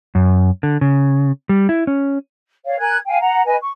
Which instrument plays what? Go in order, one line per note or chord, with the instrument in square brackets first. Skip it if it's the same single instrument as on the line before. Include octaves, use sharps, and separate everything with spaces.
[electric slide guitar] F#2
D3
C#3
G3
E4
C#4
[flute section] C#5 D5 F5
A#4 G#5 F#6 G#6
F5 G5 G#5
F#5 A#5
B4 D#5 G#5
C#6